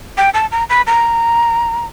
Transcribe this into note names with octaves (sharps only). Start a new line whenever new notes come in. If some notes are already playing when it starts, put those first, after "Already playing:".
G5
A5
A#5
B5
A#5